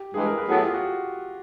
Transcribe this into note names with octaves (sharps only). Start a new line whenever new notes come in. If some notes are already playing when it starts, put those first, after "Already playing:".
Already playing: G4
G2 E3 G#3 G#4
A#4
B4
A2 F#3 B3 E4 G#4 A4
G4
F4
F#4